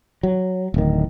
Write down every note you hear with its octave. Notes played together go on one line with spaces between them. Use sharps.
F#3
D1 D#3